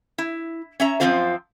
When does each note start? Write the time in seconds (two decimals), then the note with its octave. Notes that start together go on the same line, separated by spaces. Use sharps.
0.18 E4
0.80 C#4 E5 A#5
1.00 F#2 C3 F3 C4 F4 C5